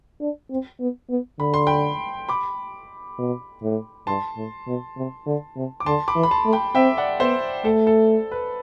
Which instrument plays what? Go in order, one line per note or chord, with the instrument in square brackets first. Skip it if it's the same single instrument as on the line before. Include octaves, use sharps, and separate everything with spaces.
[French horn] D4
C4
B3
B3
[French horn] D3 [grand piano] B5
[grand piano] C6
G5 B5
B5 D6
[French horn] B2
A2
[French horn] G2 [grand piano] A5 C6
[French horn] A2
B2
C3
D3
C3
[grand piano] D6
[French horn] D3 [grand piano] A5 C6
[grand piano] B5 D6
[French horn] E3
[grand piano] B5
A5 C6
[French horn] A3
[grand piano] G5 B5
[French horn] C4 [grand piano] E5 G5
[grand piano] D5 F#5
[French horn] B3 [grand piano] C5 E5
[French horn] A3 [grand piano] A4
[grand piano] A4
B4